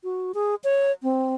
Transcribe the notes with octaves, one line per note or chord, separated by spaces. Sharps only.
F#4
G#4
C#5
C4